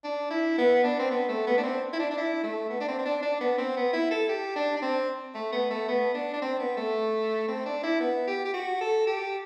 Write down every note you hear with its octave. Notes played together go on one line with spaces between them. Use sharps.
D4
E4
B3
D4
C4
B3
A3
B3
D4
C4
E4
D4
D4
E4
A3
B3
D4
C4
C4
D4
D4
B3
C4
B3
E4
A4
G4
D4
D4
C4
A3
B3
A3
B3
D4
D4
C4
B3
A3
C4
D4
E4
B3
G4
G4
F#4
A4
G4